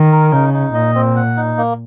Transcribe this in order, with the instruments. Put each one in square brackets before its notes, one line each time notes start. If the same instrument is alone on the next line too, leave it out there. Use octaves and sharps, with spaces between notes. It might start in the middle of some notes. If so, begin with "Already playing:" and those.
Already playing: [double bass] D#3
[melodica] A#4
[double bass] C#3 [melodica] D#4
[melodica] D#4
[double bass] A#2 [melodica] D#5
[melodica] C4
F#5
D#4
A#3